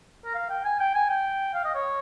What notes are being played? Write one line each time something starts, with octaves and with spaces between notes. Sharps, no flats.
A#4
F5
G5
G#5
G5
G#5
G5
F5
D#5
C#5